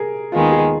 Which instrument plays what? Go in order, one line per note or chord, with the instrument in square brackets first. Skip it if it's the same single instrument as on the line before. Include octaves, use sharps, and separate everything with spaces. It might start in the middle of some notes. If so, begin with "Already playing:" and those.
Already playing: [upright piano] G#4 A#4
[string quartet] D#2 D#3 G#3 B3 [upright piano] F4
[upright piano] G#4